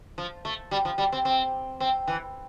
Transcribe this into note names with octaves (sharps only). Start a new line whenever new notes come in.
F3
A3
G3
F3
G3
C4
C4
C4
E3